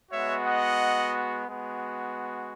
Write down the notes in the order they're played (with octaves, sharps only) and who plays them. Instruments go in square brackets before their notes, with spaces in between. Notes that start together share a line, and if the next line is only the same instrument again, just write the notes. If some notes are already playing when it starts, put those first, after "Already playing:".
[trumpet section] G#3 B3 F#4 C#5 E5
D#5 F#5
G#3 B3 F#4